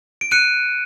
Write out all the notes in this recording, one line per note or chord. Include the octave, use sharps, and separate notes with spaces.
D7
F#6 C#7 D#7